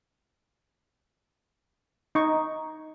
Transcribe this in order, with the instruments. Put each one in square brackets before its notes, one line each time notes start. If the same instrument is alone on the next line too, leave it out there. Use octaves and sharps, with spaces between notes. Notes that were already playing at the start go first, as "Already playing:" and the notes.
[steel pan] D#4 C#6